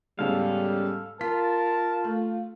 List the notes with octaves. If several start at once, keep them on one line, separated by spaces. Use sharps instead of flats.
G#2 C#3 G3 B3 A4 F5
F4 A#4 A5 B6
A3